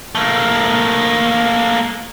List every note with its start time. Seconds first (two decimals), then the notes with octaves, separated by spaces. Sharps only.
0.15 A3 A#3